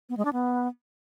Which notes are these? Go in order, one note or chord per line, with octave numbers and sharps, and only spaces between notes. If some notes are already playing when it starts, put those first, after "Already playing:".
B3
G#3
D4
B3